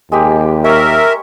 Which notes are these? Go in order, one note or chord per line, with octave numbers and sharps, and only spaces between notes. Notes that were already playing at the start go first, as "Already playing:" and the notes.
D#2 G#3 A#3 G4
A#4 C#5 E5